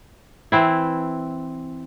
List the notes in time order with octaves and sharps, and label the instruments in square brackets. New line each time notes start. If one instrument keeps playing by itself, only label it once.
[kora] E3 C4 E4